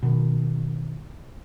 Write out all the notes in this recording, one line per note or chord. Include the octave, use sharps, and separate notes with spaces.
B2 D#3